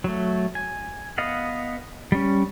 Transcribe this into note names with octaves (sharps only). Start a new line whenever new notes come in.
F#3 A3
G#5
B3 D#5 F5 F#5
G3 C#4